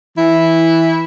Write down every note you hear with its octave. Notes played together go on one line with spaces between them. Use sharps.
E3 E4